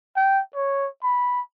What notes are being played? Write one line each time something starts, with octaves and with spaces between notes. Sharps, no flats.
G5
C#5
B5